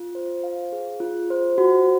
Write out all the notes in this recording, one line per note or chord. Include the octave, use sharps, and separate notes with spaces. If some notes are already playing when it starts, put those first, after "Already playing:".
Already playing: F4
C5
F5
G#4
F4
C5
F#4